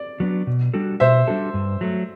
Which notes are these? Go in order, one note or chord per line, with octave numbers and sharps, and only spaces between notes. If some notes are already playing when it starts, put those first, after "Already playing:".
Already playing: D5
F#3 B3 D4
B2
G3 D4 F#4 A4
B2 C5 E5
G3 D4 F#4 A4
G2
F#3 A3